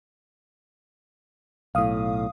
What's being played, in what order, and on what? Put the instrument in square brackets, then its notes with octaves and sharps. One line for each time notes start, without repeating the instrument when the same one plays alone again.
[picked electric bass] B1 A2 [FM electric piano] F5 D#6